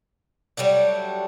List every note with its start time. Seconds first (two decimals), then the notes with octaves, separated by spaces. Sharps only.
0.57 F#3 G3 A3 D4